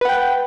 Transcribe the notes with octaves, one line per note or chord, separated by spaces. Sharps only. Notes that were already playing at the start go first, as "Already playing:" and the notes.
B4 F#5 G5